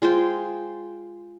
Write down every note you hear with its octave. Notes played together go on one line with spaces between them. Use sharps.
G#3 F4 C5 G5